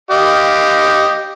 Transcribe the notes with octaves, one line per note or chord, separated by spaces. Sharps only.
G4 D#5 F5